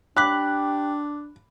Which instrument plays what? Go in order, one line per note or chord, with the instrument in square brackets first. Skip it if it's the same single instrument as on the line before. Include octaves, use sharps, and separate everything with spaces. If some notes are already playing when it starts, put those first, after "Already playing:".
[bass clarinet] D4 [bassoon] G4 [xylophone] B5 D6 B6 [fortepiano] F#6